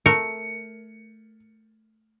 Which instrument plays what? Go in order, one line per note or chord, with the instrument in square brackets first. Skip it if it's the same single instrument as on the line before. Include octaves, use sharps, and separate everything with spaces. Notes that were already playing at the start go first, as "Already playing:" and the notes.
[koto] A3 A#4 [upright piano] C#7